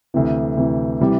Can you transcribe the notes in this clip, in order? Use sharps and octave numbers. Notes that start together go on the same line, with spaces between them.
D2 C3 E3
D2 C3 E3
C3 E3 G3